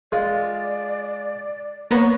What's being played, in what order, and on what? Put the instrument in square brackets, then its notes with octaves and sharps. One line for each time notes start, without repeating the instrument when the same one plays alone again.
[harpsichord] G#3 F4 [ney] D5
[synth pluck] A#3 B3 B4 [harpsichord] C#5 A#5